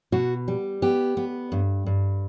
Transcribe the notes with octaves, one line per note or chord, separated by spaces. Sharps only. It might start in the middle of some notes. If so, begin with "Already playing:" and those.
B2 F#4
G3
B3 G4
B3
G2
G2